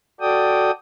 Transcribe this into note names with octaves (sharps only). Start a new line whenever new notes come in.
F#4 A4 D5 G5 D#6